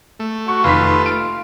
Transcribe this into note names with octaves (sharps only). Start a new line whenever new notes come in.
A3
F#4 C#6
F1 D#3 F4 B4 F5 B6
F5 D7